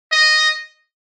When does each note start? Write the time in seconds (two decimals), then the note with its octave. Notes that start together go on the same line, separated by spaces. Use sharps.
0.12 D#5